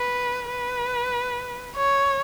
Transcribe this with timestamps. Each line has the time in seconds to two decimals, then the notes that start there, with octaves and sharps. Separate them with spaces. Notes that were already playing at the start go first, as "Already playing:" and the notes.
Already playing: B4
0.51 B4
1.76 C#5